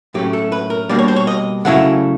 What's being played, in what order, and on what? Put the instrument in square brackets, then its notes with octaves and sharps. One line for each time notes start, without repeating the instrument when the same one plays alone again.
[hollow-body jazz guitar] A2 F#3 A3 C#4 G4
A4
B4
A#4
B2 G3 A#3 D4 D5
C#5
C5
C#5
D#5
C#3 F#3 A3 C#4 E4 F#5